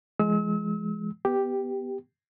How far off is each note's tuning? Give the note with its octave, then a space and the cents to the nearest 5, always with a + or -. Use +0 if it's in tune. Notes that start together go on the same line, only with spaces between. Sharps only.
F3 -40 G#3 +15 E6 -40
B3 +0 G4 +0